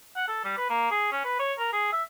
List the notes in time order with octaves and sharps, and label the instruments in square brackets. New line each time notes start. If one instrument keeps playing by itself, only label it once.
[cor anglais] F#5
A4
G3
B4
A#3
G#4
C#4
B4
C#5
A#4
G#4
E5